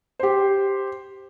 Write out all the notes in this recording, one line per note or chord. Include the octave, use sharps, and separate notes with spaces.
G4 C5